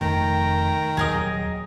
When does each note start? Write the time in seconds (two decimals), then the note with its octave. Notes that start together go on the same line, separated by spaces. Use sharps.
0.01 F1 D#3 A3 G5 A#5
0.97 D#1 D#2 F#3 G#4 A#4 D#5